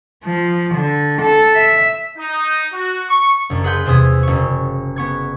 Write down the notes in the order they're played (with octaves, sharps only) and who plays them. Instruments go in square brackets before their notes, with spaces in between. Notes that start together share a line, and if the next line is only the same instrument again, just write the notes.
[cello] F3
D3
A4
E5
[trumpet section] D#4
F#4
C#6
[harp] F#1 F#2
G#4 B4 F#5 C6 G6
E2 C3 G#4 E5 D#6 G#6
F#1 C#6
B3 C#6 G#6